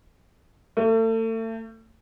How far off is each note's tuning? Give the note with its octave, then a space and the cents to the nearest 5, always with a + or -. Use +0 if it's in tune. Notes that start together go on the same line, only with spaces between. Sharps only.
A3 +35